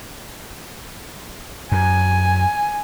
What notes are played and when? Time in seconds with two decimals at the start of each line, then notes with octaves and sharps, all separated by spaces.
1.72 F#2 G#5